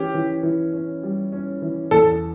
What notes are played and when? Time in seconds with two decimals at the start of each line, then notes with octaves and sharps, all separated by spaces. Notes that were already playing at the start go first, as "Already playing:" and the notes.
Already playing: E3 C#4 G4
0.15 E3
0.43 E3
0.73 C#4
1.03 G3
1.32 C#4
1.62 E3
1.91 E2 A4